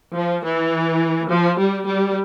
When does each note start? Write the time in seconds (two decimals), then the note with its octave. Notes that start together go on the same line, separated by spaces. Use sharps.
0.15 F3
0.44 E3
1.31 F3
1.59 G3
1.88 G3